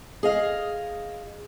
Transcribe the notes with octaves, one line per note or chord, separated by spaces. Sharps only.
G#4 D#5 F5